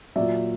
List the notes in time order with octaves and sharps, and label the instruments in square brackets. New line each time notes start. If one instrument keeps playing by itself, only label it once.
[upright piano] A#2 F#3 D5 E5